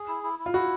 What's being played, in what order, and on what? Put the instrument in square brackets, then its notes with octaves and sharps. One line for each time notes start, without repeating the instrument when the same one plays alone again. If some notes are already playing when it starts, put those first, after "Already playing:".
Already playing: [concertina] G#4
E4
E4
E4
[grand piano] F4
[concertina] E4 [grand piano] F#4